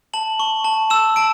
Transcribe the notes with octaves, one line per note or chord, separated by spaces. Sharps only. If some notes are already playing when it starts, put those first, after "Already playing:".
A5 F#7
C#6
A5
E6 E7
A5 D7